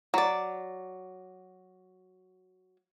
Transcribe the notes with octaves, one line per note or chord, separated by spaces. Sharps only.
F#3 D5